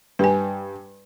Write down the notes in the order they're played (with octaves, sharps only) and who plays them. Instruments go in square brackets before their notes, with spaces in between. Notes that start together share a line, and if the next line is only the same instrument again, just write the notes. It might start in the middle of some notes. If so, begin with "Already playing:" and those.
[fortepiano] G2 G3 [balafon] B4 G#5